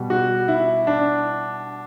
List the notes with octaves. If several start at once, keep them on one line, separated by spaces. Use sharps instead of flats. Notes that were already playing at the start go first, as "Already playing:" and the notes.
Already playing: B2 G3
F#4
E4
D4